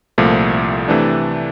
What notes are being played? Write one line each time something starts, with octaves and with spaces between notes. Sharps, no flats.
C2 A#2 F3 A3
C3 E3 A3 D4